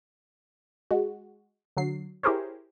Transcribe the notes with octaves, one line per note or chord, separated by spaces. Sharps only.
G#3 F#4
D3 F#3 C7
E4 G4 G#4 A#4 C5 C#5